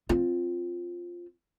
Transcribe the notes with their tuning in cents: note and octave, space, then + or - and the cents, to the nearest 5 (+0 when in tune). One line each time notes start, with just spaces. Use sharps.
C4 +0 F4 +0